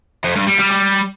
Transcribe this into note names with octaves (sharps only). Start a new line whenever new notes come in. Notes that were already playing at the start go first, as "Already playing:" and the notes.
F2
G2
G3
G3
G3